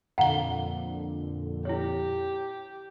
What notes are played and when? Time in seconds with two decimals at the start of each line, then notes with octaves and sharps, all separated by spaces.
0.18 F2 A#2 D3 F5 F#5 A#5 G7
1.65 E4 G4 C#5